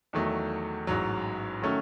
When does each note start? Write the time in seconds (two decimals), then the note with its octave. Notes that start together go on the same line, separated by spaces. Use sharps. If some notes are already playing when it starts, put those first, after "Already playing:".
0.13 E2 D#3 F#3 A3
0.87 A1 G#2 F#3
1.62 D#3 F#3 A3 C#4